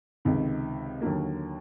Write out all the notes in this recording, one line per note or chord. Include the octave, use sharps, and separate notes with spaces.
C#2 C3 D#3
D#2 D3 F#3 A#3